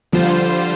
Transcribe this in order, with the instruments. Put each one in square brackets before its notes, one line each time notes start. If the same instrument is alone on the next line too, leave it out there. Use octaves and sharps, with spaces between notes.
[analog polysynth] D3 G3 F4 C5 [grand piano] F3